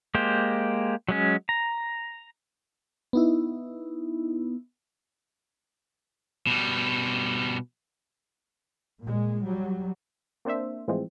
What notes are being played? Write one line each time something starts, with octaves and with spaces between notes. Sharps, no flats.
G#3 A#3 G4 C5
F#3 G#3 C#4
A#5
B3 D#4 E4
B2 G3
A#2 G#3
F#3 G3
A#3 C4 D4 C5 E5
A2 E3 F3 G#3 C4